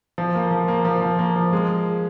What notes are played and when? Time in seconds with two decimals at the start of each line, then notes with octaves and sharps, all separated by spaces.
0.18 F3
0.35 A#3
0.51 F3
0.68 A#3
0.85 F3
1.01 F3
1.19 A#3
1.36 F3
1.53 G#3